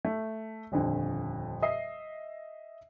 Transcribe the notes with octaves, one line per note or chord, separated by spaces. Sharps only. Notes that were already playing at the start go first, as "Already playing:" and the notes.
A3
D#1 F2 D3
D#5 E5 D#6 C7